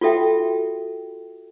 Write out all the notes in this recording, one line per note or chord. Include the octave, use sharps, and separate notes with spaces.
F4 F#4 A4 E5 G5